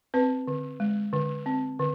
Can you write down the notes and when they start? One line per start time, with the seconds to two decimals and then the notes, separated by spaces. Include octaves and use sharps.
0.14 C4 B4
0.48 D3
0.80 G#3
1.13 D3
1.46 C4
1.79 D3